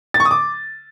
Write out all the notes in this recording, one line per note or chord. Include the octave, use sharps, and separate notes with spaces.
A6
C#6
D#6
D6